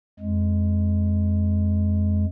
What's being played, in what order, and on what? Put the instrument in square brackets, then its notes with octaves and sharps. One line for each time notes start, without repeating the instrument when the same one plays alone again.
[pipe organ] F2 G#3